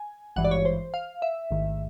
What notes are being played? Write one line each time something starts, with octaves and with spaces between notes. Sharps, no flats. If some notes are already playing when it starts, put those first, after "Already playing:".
Already playing: G#5
G#1 G2 E3 F#5
D5
C#5
C5
F5
E5
A1 G#2 D#3